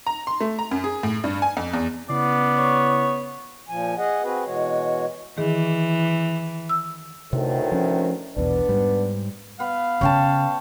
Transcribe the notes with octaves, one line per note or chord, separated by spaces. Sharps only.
A#5
C6
A3
A#5
F#2
G#4
A2
G2
G#5
F2
E2
C#3 B3 E4 D5 C7
C#5
A#2 F3 G#5
G#4 D#5 F#5
C4 F#4 G#4 B4
B2 E3 G#3 F#4 C#5
D#3 E3 G#4
E6
D2 A2 C3 D#3
F3 C#4
A#1 E2 B2 B3 D4
G#2 G3
B3 F5
C#3 C#5 G5 A5